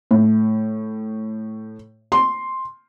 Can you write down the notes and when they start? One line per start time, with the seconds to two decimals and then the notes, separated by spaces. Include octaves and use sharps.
0.11 A2
2.12 C6